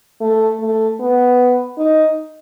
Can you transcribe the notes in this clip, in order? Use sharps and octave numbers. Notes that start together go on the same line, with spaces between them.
A3
A3
B3
D#4